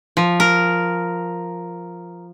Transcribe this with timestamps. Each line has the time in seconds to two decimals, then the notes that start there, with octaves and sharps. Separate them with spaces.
0.17 F3
0.40 A#4